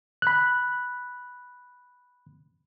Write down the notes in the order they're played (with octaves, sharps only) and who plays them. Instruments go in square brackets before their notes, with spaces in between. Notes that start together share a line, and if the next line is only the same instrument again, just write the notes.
[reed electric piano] B5 F#6